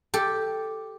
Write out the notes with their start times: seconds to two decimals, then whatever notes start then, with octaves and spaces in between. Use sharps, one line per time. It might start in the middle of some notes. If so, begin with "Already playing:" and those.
0.14 G4 A4